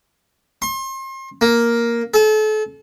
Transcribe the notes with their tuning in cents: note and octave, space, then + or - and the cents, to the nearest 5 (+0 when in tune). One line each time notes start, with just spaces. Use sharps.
C6 +35
A#3 +5
A4 -35